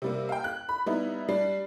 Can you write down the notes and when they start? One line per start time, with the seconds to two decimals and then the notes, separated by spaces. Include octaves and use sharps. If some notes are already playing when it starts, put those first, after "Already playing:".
0.02 C3 G3 A#3
0.29 F5 G5
0.44 F#6
0.69 B5
0.86 G3 B3 D#4 E4
1.29 G3 D4 C7